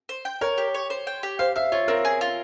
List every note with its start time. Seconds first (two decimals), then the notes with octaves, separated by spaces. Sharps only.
0.09 C5
0.25 G5
0.41 A#4 C#5
0.58 G4
0.74 C#5
0.90 C5
1.07 G5
1.23 G4
1.39 C5 F5
1.56 E5 F5
1.72 F4 C#5
1.88 C4 A#4
2.05 G#4
2.21 F4